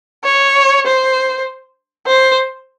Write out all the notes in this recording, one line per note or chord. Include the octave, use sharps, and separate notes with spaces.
C#5
C5
C5